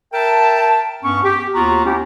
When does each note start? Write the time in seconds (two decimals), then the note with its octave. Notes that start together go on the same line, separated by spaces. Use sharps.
0.14 A#4 E5 G5 A5
1.03 G2 B3 C#4 C#6
1.24 G4
1.55 D#2 B3 F4 F#4 A#5
1.85 A#3 C#4 E4 G4